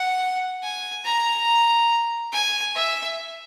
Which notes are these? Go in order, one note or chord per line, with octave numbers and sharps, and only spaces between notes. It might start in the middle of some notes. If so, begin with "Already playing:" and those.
Already playing: F#5
G#5
A#5
G#5
E5